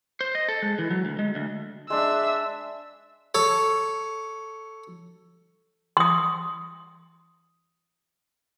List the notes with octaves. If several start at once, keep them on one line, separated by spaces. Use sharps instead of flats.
C5
D#5
A4
G#3
E3
F#3
D2
G#3
D2
G#3 D4 E5 E6
A4 C#5
C6 D#6